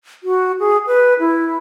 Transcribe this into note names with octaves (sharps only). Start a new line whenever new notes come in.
F#4
G#4
B4
E4